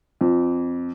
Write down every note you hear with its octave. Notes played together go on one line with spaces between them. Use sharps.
F2